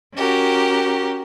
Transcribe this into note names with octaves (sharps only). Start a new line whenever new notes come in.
C#4 F#4 G4 A#4